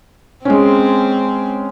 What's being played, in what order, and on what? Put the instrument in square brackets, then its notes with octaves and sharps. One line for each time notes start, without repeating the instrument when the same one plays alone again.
[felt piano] G#3 C#4 [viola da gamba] C4